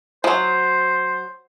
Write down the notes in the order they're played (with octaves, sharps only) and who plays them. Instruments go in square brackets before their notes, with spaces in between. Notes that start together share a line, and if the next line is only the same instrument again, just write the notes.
[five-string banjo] F3 F#3 [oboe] C5